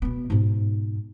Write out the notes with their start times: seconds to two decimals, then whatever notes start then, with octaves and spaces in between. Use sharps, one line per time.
0.02 B2 B3
0.30 G#2 B2